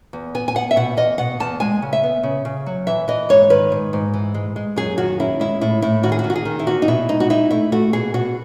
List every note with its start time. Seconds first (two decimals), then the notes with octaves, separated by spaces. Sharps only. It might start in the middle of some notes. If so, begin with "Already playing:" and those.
0.13 E2
0.35 B3 G#5
0.48 G#5
0.55 B3 F#5
0.71 E5
0.76 B2 F#5
0.97 E2 D#5
1.18 B2 F#5
1.40 E2 A5
1.60 G#3 G#5
1.82 C#3
1.93 E5
2.03 B3
2.23 C#3
2.45 C#3
2.66 F#3
2.87 E3 E5
3.08 E3 D#5
3.29 G#2 C#5
3.50 D#3 B4
3.72 G#2
3.93 G#2
4.14 E3
4.34 G#3
4.56 G#3
4.76 F#2 G#4
4.98 D#3 F#4
5.20 C#4 E4
5.40 G#3 E4
5.61 A2 E4
5.82 A2 E4
6.03 D#3 F#4
6.12 G#4
6.19 F#4
6.24 D#3
6.30 F#4
6.35 G#4
6.45 D#3
6.59 E4
6.66 E2 F#4
6.82 D#4
6.88 B2 E4
7.09 G#3 D#4
7.20 F#4
7.30 D#4 E4
7.51 A3 E4
7.72 A3 F#4
7.93 B2 G#4
8.14 B2 F#4